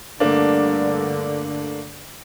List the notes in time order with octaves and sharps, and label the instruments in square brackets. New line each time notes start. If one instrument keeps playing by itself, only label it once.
[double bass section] G2 D3 [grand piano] A3 A#3 D4